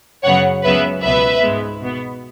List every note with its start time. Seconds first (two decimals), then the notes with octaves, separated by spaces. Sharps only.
0.24 F#2 C#3 F#3 B3 C#5 F#5
0.64 C#2 C#3 F#3 B3 B4 E5
1.03 C#2 B2 B3 B4 E5
1.41 G#2 G#3 B3
1.81 B2 B3